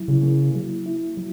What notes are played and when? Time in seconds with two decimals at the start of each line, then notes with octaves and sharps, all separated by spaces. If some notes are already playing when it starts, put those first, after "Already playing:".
Already playing: F#3 E4
0.08 C#3
0.23 A#3
0.55 F#3
0.86 E4
1.17 F#3